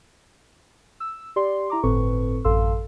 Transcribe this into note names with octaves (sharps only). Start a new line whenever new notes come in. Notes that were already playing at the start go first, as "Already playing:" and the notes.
E6
G4 D5 C6
E4 A#5 D6
G1 A2 C4 A4 B4 C#6
A1 F#2 A4 F5 C6 E6